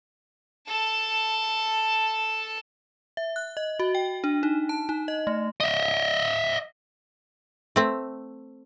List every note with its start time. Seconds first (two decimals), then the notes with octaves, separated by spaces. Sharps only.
0.68 A4 A5
3.17 E5
3.36 F#6
3.57 D#5
3.79 F#4
3.95 G5
4.24 D4
4.43 D#4
4.69 A5
4.89 D#4
5.08 D#5
5.27 A3
5.60 D#5 E5
7.76 A3 C4